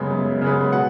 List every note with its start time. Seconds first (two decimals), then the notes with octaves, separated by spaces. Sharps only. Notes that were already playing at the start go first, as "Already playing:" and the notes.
Already playing: F#2 C#3 G#3 B3
0.11 F#2
0.41 C#3 G#3 B3
0.72 B2 F#5